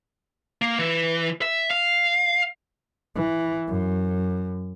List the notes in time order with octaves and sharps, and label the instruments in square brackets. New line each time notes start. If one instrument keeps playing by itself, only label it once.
[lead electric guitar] A#3
E3
E5
F5
[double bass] E3
F#2